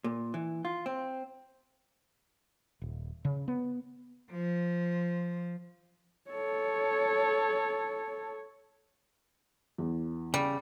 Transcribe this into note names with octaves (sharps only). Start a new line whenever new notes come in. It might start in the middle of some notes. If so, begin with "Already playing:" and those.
A#2
E3
F4
C4
D#1
C#3
B3
F3
A4 C#5
E2
C#3 G3